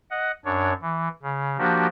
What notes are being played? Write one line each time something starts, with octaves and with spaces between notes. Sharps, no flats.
D#5 F#5
F#2 D4 C#5
E3
C#3
F3 A#3 D4 F#4 G4